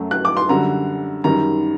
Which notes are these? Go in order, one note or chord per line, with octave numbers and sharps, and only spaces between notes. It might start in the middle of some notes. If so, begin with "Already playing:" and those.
Already playing: F#2 F#3 A3
F#6
D6
C6
F#2 D3 G3 A#5
F#2 D#3 G3 A#5